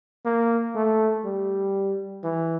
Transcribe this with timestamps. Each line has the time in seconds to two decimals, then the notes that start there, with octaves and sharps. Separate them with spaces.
0.25 A#3
0.75 A3
1.24 G3
2.23 E3